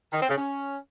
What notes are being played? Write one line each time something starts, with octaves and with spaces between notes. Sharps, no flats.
D#3
C4
C#3
C#4